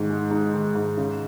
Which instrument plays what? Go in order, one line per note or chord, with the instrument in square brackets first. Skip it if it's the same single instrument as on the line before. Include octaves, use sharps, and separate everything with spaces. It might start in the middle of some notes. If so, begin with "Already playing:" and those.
Already playing: [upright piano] G#2 D#3
G#3
D#4
D#3
G#2
C#3